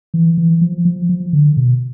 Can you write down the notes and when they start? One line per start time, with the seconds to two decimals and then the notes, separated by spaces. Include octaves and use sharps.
0.14 E3
0.38 E3
0.61 F3
0.85 F3
1.09 F3
1.33 D3
1.57 B2